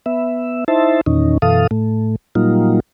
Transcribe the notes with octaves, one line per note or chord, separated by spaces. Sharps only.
B3 E5
D#4 E4 C5 E5 A5
E2 A#2 D#3 C#4 D#4
F#2 B2 E3 A4 F5 D#6
A2 A3
A#2 F#3 G3 A#3 D#4 F4